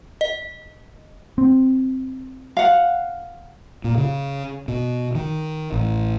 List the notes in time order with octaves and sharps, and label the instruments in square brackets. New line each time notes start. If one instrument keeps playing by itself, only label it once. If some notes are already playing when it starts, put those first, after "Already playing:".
[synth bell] D#5
[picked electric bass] C4
[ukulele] F5 F#5
[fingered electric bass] A#2
C#3
B2
D#3
A1